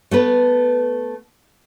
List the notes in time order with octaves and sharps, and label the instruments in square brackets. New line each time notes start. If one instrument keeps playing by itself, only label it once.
[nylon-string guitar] A3 B3 B4